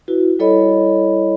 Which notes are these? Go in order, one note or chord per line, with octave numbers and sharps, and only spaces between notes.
E4 F#4 B4
G3 E4 A4 C#5 D#5 B5